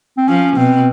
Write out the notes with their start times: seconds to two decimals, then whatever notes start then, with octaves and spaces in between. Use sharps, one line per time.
0.17 C4
0.28 F3 C#4
0.57 B2 C4